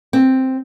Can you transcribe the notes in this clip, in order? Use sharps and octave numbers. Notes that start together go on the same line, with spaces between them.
C4